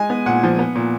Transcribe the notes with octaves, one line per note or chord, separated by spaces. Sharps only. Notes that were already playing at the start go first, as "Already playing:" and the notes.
Already playing: G#3 G#5
B3
A#2 F#5
F3
B3
A#2